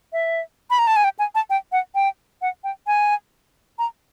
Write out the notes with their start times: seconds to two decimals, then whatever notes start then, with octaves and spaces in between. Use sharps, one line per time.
0.13 E5
0.70 B5
0.79 A#5
0.87 A5
0.96 G#5
1.04 G5
1.19 G#5
1.35 A5
1.50 G5
1.72 F#5
1.95 G5
2.42 F#5
2.64 G5
2.87 G#5
3.79 A#5